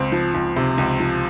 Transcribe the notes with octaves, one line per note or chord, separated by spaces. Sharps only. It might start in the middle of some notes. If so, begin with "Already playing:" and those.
Already playing: C#2 C4
F3
C#2
C3
C#2
F3